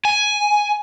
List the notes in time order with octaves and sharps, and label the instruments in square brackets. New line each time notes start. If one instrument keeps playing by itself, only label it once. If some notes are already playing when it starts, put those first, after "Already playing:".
[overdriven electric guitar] G#5